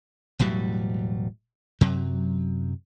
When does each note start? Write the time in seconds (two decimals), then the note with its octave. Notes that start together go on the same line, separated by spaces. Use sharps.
0.39 E1 A2 F#3 G3
1.81 F#2 C3 F#3